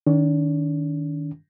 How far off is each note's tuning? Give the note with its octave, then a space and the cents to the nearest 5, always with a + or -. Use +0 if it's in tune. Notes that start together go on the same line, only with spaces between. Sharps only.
D#3 +0 D4 -45